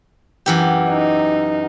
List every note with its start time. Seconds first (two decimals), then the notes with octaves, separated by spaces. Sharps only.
0.46 F#2 E3 G4
0.90 D#4